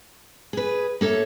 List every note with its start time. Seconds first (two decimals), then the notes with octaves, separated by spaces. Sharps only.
0.53 G#4 B4
1.01 A#3 A4 C#5 E5